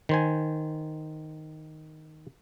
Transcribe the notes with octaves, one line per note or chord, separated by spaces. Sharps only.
D#3 C5 G#5